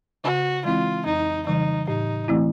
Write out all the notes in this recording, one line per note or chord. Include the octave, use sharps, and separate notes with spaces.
C#3 F#4
E3 G#3 C4 E4 F4
F2 D#4
C#3 E3 G3 D#4
A2 D#4
E3 A3 C4 E4